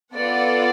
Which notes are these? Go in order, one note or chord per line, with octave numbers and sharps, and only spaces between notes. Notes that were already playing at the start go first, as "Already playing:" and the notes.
B3 F4 A4 D5 F#5